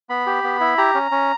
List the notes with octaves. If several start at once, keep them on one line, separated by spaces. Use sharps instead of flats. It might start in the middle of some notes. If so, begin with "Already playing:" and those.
B3 B5
G4
B3
E4
G4 A#5
C#4
C#4